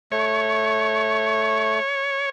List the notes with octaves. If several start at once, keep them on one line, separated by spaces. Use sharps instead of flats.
A3 C#5